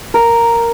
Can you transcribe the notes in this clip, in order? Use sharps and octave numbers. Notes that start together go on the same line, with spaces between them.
A#4